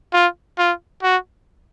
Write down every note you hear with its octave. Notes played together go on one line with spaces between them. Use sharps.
F4
F4
F#4